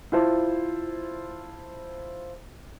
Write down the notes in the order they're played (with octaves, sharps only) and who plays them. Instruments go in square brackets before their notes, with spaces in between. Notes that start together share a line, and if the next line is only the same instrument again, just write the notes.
[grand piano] E4 F4 C5 A5